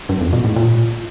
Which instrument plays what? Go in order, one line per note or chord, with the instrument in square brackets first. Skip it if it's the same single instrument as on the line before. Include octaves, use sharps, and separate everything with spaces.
[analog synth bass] G2
F2
B2
A2
A#2